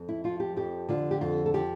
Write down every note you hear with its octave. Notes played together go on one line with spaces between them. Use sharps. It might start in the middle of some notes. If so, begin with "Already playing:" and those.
Already playing: F2
E4
F3 F4
G4
F2 G4
D3 F4
G4
F2 F4
A4
F3 G4